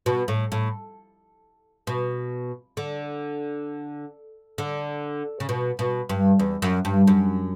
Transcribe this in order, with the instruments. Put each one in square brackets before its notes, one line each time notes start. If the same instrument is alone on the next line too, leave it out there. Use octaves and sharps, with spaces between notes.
[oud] B2
A2
A2
B2
D3
D3
C#3
B2
B2
G2
E2
F#2
G2
F#2